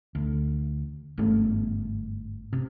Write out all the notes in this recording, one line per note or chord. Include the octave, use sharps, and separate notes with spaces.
D2
G1 G#2 A3
C3